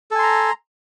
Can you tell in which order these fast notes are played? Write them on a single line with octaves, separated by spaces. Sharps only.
A4 G#5 C6 A#5